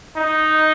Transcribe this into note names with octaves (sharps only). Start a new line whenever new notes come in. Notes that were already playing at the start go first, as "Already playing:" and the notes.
D#4